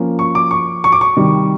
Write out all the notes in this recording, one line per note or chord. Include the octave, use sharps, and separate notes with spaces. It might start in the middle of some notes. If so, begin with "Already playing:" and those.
Already playing: F3 A#3 C#4
C#6
D6
C#6
C#6
D6
C#6
C3 D#3 G3